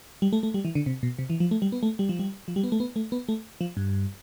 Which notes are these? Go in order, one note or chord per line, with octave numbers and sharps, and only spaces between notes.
G3
A3
A3
G3
E3
D3
C3
B2
C3
E3
F3
A3
G3
B3
A3
G3
F3
G3
F3
G3
B3
A3
B3
A3
B3
A3
F3
G2